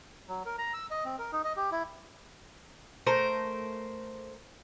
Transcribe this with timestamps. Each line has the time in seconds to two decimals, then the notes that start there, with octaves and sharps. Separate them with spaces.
0.28 F#3
0.46 A#4
0.58 A#5
0.74 E6
0.91 D#5
1.05 C4
1.18 A#4
1.32 D#4
1.44 D#5
1.56 G4
1.72 E4
3.07 A3 A#4 C5